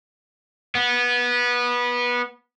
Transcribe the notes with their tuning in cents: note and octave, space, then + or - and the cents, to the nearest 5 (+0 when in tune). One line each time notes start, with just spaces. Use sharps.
B3 -20